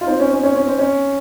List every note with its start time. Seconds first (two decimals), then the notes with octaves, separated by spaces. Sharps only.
0.01 F4
0.07 C4 D#4
0.20 C#4
0.32 C#4
0.43 C#4
0.55 C#4
0.67 C4
0.79 C#4